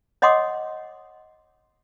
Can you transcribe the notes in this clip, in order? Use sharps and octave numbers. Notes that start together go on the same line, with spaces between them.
C#5 D#5 F#5 C6 D6 D#6